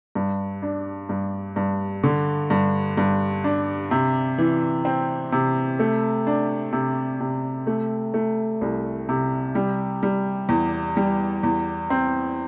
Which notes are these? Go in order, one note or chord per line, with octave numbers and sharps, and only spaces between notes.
G2
D4
G2
G2
D3
G2
G2
D4
C3
E3
C4
C3
A3
D4
C3
C3
A3
A3
C2
C3
G3
G3
E2
G3
E2
C4